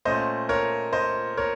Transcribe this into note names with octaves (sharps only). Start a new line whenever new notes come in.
A#2 A3 C#4 C5 D#5
A#4 C#5
C5 D#5
A#4 C#5